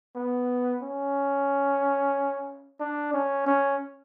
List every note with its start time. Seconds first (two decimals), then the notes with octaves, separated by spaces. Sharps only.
0.15 B3
0.82 C#4
2.80 D4
3.13 C#4
3.46 C#4